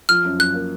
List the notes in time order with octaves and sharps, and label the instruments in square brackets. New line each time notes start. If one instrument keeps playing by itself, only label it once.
[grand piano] F3 [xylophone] F6
[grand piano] F#2
[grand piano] F#2 [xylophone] F#6
[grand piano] A#3